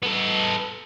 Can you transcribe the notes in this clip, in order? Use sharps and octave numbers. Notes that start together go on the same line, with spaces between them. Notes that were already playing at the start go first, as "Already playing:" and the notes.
B3 A4